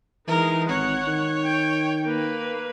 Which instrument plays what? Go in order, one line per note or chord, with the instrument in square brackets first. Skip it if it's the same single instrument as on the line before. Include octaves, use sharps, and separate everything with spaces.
[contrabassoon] E3 [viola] G#3 D#4 [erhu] A#4
[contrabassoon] G#1 [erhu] C#5 [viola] F#5
[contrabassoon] D#3
[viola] G5
A#3 B4